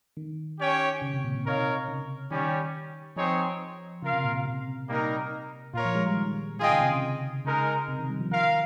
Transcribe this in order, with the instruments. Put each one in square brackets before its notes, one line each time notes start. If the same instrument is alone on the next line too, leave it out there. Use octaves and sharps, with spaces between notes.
[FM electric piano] D#3
[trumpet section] C#4 G4 C#5 G5
[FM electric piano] C#3
C3
A#2
A#2
[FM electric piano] C3 [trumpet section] D#4 A#4 C#5 F5
[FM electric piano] C#3
[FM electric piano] D#3 [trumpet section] G3 C#4 G4 C#5
[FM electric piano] F3 [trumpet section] C4 D#4 G#4 C#5
[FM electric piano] C#3 [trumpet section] F4 A#4 F5
[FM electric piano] C3
A#2
C3
C3
[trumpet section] G3 A#3 D#4 A#4
[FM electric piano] A#2 [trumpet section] F4 A#4 C#5
[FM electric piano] F3
G#3
G3
D#3
[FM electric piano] D#3 [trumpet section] F4 G#4 D#5 G5
[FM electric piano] C#3
C3
C#3
[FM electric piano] C#3 [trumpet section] G#3 D#4 A#4
[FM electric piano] C3
D#3
G3
F3
[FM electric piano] D#3 [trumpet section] F4 A#4 F5